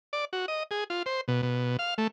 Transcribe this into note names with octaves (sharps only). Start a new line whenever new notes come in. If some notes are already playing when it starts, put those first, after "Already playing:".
D5
F#4
D#5
G#4
F4
C5
B2
B2
F5
A3